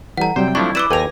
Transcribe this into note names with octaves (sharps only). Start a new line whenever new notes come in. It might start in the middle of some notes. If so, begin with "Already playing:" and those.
E3 G3 A4 F#5 A#5
C3 F#3 G3 C4 C5 G5
F3 A3 D4 E4 C#6
B4 D5 D6 E6 E7
D#2 A4 B4 G5 G#5 A#6 F7